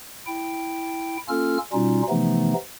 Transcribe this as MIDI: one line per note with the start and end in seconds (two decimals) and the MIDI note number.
0.27 1.17 64
0.27 1.17 79
1.29 1.58 58
1.29 1.58 61
1.29 1.58 65
1.29 1.58 69
1.29 1.58 89
1.73 2.02 47
1.73 2.02 55
1.73 2.02 61
1.73 2.02 63
1.73 2.02 65
2.09 2.53 48
2.09 2.53 52
2.09 2.53 53
2.09 2.53 57
2.09 2.53 59
2.09 2.53 63